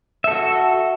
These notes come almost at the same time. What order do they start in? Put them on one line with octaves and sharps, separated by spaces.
E5 A4 F#4